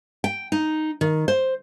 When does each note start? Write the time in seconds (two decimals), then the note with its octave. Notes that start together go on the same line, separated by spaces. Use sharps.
0.24 G5
0.52 D#4
1.01 D#3
1.28 C5